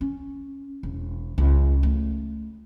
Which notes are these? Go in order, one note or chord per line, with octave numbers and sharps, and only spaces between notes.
C#4
E1
C#2
A3